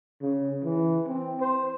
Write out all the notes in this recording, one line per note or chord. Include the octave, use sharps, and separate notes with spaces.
C#3
E3
C4
C5